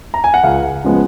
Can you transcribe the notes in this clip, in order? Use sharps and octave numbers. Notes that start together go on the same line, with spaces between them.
A#5
G#5
F#5
C#2 F5
C#3 F3 G#3 B3